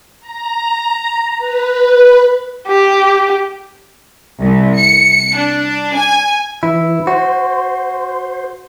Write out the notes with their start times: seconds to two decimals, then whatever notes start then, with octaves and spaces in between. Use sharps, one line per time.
0.20 A#5
1.38 B4
2.68 G4
4.39 C2
4.77 C#7
5.37 D4
5.97 G#5
6.63 E3 E4
7.07 F#4 C5